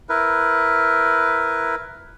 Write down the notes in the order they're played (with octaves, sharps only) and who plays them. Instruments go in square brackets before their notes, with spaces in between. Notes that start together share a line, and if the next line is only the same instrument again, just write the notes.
[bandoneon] E4 A#4 B4